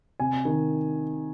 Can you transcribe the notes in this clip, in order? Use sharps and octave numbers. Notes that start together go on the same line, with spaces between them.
C3 G#5
D#3